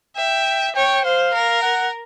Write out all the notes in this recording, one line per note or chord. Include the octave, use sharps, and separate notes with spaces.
E5 G5
C#5 G5
C5 F5
A#4
F#5